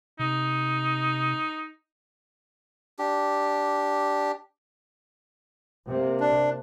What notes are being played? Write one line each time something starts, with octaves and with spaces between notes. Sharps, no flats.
C3 D#4
D4 G4
C3 A#3
D4